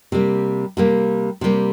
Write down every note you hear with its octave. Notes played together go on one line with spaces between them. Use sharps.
C3 G3 A#3
C3 G3 A#3
C3 G3 A#3